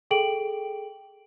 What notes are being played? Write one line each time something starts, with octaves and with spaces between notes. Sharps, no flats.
G#4 A4 G5 D7 F#7